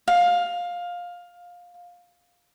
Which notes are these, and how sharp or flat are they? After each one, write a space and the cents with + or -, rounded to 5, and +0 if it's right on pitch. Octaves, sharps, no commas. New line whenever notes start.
F5 +15